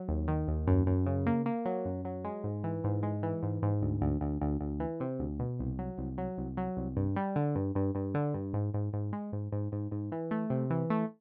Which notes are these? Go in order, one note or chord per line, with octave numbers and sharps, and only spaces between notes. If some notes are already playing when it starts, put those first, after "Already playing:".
Already playing: F#3
D#2
D#3
D#2
F#2
F#2
C#3
A#3
A#3
F#3
F#2
F#3
G#3
G#2
E3
G#2
G#3
E3
G#2
G#2
D2
D2
D2
D2
D2
E3
C3
D2
B2
C2
F#3
C2
F#3
C2
F#3
C2
G2
G3
D3
G2
G2
G2
D3
G2
G#2
G#2
G#2
G#3
G#2
G#2
G#2
G#2
E3
A3
C3
E3
A3